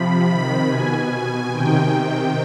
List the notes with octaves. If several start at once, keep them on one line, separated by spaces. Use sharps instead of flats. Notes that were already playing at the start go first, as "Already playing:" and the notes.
Already playing: C3 F3 B5
C3 D#3 B5
B2 G#5
B2
C3 D#3 G5
C3 D#3 G5